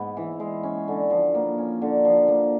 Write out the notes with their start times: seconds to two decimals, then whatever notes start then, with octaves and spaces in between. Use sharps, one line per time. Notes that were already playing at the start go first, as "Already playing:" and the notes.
Already playing: G#2 G#3 B3
0.17 E3
0.40 G#3
0.63 C#4
0.88 D3
1.10 F3
1.35 A#3
1.58 C#4
1.82 D3
2.05 F3
2.28 A#3